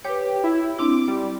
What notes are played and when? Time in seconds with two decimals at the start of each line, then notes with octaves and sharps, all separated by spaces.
0.05 G4 B4 C#5
0.44 E4
0.79 C4 D4 E4 D6
1.08 G3